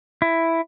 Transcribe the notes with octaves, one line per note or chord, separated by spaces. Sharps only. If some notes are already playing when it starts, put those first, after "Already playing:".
E4